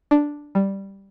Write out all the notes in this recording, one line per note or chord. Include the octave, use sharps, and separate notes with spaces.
D4
G3